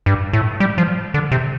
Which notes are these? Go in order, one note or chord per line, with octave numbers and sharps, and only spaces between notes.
G2
A2
G3
F3
D3
C3